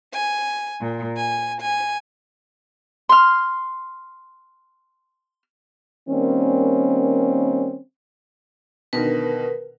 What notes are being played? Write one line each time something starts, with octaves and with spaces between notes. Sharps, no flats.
G#5
A#2
G#5
G#5
C6 F6
D#3 G3 A#3 C4 C#4
B2 D3 D#3 A#4 B4